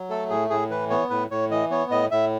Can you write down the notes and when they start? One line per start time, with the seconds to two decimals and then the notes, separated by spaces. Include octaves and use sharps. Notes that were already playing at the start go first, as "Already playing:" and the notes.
Already playing: F#3
0.10 A3 A4
0.30 A2 G#4
0.50 A2 G#4
0.70 E3 B4
0.90 B3 C#5
1.10 A2 B4
1.31 A2 C#5
1.51 E3 D#5
1.70 B3 C#5
1.91 A2 D#5
2.11 A2 E5